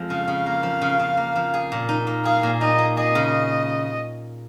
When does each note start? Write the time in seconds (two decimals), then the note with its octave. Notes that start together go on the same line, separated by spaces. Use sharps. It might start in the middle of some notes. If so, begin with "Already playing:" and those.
Already playing: F2 F3 G#3
0.10 C#3 F5
0.28 C#3
0.46 A#3
0.63 F3
0.81 C#3
0.99 C#3
1.17 A#3
1.35 F3
1.54 G#4
1.72 A#2
1.89 D#4
2.07 A#3
2.25 G#4 F5
2.43 A#2
2.61 D#4 D#5
2.78 A#3
2.97 G#4 D#5
3.15 C#3